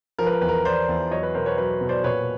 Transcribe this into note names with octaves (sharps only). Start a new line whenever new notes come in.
F3 A#4
B4
A#4
E2 B4
A#4
E2 C5 D5
E2
F#3 C#5 D#5
B4
B2 A#4 C5
B4 C#5
F#3 B4 C#5
B2
C5 D5
A#2 B4 C#5